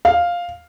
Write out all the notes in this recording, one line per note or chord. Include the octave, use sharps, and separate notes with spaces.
F5